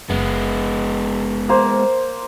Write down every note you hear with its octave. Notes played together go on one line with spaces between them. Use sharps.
F#1 G#3 B3
A#3 C5